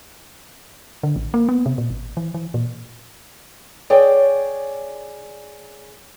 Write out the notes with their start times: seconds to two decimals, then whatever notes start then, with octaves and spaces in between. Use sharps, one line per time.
1.03 D3
1.16 A1
1.34 A#3
1.49 B3
1.66 C3
1.78 A#2
1.90 G#1
2.17 E3
2.34 E3
2.54 A#2
3.90 G#4 C#5 D5 G5